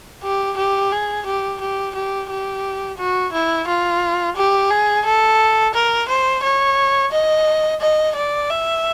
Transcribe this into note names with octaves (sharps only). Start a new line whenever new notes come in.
G4
G4
G#4
G4
G4
G4
G4
F#4
E4
F4
G4
G#4
A4
A#4
C5
C#5
D#5
D#5
D5
E5